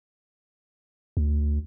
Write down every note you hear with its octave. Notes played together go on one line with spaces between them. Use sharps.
D2